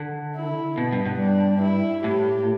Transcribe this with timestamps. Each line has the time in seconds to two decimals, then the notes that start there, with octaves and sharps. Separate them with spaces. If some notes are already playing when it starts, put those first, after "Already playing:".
Already playing: D3
0.36 E4
0.78 B2 B3
0.92 G2
1.06 G2
1.20 D4
1.62 E4
2.04 A2 G4